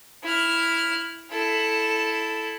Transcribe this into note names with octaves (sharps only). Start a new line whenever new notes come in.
E4 F6
E4 A4